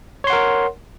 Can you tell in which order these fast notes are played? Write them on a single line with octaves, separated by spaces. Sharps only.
C#5 C6 F#5 A#4